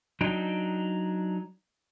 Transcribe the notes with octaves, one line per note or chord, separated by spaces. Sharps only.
F#3 D4 D#4 G5